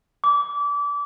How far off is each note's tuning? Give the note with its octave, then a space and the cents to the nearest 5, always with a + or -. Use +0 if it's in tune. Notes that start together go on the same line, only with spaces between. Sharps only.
D6 -25